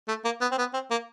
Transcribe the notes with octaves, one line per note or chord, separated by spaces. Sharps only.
A3
A#3
B3
C4
B3
C4
A#3